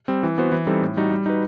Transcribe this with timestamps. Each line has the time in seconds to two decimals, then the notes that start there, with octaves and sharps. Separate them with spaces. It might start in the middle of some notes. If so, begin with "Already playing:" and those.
0.08 G3 C4
0.23 E3
0.38 B3 F#4 C5
0.52 E3
0.67 G3 C4 D#4 A4
0.82 A2
0.97 G3 D#4 F#4
1.11 G3
1.26 D#4 F#4 B4